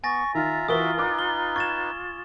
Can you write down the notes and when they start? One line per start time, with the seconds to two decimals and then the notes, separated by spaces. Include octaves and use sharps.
0.04 B3 G#5 C#6 A6 A#6
0.35 D#3 F4 E5 A#5
0.68 E3 E4 F#4 A#4 E5 D#6 G7
0.98 D#4 B4 A#5 D6
1.19 G7
1.56 C#6 G#6 A6 E7